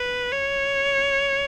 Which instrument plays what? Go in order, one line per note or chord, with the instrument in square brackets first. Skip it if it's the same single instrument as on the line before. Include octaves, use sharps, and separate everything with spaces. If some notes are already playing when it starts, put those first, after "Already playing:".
Already playing: [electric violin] B4
C#5